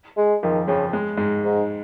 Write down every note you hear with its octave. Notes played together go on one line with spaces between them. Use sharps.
G#3
F2 D#3 F3
F2 C#3 F3
G#3
G#2 G#3
G#2